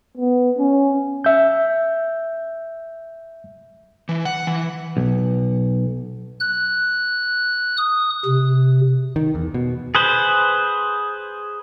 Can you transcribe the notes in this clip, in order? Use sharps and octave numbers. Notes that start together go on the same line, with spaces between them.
B3
C#4
E5 G6
E3
F#5
E3
B1
F#6
D#6
C3
D#3
E2
B2
G#4 B4 C5